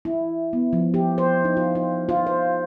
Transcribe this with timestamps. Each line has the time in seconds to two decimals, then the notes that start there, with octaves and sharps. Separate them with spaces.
0.05 E4
0.53 B3
0.73 F3
0.94 G4
1.18 C5
1.45 D#4
1.57 F4
1.75 F4
2.09 F4
2.27 C5